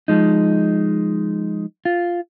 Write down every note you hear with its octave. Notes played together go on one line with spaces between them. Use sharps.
F3 G#3 D#4
F4